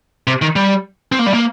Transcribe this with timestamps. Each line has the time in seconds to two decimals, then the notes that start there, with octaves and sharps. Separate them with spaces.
0.27 C3
0.42 D#3
0.56 G3
1.12 C4
1.19 A#3
1.26 G3
1.34 A#3